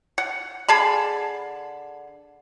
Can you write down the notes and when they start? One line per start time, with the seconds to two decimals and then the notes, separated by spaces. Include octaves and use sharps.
0.18 F#5
0.68 D3 G#4 A5 B5